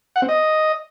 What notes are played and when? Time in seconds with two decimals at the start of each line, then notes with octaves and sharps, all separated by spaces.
0.16 F#5
0.22 C4
0.29 D#5